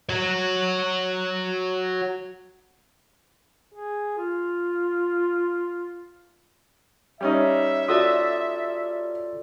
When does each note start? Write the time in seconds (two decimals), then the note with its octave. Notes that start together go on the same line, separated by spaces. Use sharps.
0.09 F#4 C#5
3.73 G#4
4.18 F4
7.21 G3 C#4 D#4 E5
7.88 F4 F#4 A4 D5 D#6